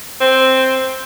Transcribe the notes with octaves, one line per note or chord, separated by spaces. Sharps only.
C4